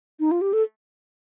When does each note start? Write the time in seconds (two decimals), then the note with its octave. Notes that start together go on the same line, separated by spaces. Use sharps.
0.20 D#4
0.31 F4
0.41 G4
0.53 A4